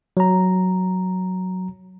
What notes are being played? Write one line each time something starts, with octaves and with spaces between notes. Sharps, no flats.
F#3 A#5